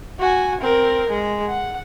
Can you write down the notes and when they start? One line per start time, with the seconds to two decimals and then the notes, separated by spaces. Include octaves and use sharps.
0.19 F#4 G#5
0.61 C4 A#4
1.09 G#3
1.48 F#5